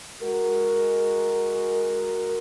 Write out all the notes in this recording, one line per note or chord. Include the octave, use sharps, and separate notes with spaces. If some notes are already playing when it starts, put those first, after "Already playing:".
G#3 F#4 A#4